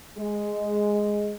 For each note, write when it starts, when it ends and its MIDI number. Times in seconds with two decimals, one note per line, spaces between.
0.18 1.32 56